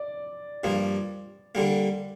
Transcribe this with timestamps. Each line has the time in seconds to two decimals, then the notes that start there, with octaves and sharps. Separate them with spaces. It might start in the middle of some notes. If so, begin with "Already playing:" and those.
Already playing: D5
0.64 G2 F3 A#3
1.55 D3 G3 A#3